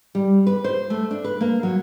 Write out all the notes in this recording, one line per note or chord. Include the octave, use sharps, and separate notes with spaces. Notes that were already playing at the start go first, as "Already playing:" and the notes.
G3
B4
C5
A3
D4
B4
A#3
F#3